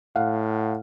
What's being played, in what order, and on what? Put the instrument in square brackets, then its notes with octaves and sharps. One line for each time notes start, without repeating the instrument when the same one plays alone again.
[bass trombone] A2 [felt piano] F5 F#5